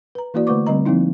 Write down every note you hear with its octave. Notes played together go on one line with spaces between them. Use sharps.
B4 A#5
E3 A#3 E4 F#4 D5
D3 A3 B4 C5 C#6 D6
D3 G3 C4 D#5 A#5
F3 A#3 C4 D#4 E4